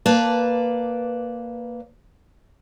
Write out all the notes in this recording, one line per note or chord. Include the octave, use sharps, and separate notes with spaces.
A#3 B4 D5 A5